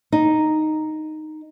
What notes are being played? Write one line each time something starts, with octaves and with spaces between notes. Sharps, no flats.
D#4